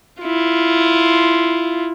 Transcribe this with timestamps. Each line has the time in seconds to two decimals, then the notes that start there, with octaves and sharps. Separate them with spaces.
0.22 E4 F4